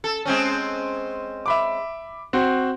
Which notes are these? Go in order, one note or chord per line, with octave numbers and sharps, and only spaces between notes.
A4
G#3 C4 C#4
E5 B5 D6
C4 F#4 C5